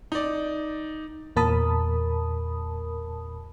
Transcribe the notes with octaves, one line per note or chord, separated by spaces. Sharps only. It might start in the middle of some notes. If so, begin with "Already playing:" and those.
D#4 D5
E2 A#2 A#4 A5 B5 D#6